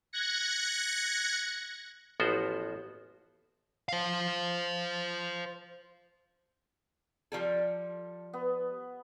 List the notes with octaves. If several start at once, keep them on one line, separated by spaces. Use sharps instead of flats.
F#6 G#6 A#6 C#7
A1 F3 B3 F#4 C5
C5 F5
F3 G3 A4
B3